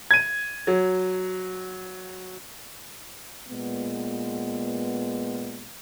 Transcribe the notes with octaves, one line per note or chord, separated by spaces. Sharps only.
G#6 D#7
F#3
A#2 G#3 B3